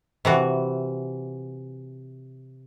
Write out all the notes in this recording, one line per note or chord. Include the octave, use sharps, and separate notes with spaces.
C3 E3 F#4